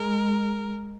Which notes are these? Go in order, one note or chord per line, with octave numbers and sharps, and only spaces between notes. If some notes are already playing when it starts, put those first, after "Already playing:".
Already playing: G#3 A#4